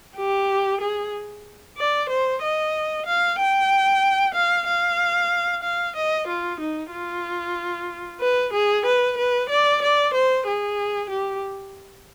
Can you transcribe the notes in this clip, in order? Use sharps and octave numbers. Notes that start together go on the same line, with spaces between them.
G4
G#4
D5
C5
D#5
F5
G5
F5
F5
F5
D#5
F4
D#4
F4
B4
G#4
B4
B4
D5
D5
C5
G#4
G4